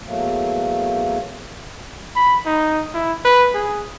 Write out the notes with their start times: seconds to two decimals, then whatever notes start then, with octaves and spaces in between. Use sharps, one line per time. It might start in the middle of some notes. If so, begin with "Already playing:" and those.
0.05 E2 F#3 A3 A#3
2.16 B5
2.46 D#4
2.94 E4
3.25 B4
3.54 G#4